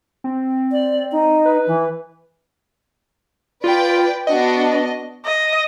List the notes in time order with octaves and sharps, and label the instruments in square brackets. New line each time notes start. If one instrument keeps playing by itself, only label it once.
[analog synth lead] C4
[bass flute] D5
D#4
[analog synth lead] B4
[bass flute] E3
[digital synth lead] F4 [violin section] B4 D5 G5
[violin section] B3 D4 F#4 [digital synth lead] D#5
[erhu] D#5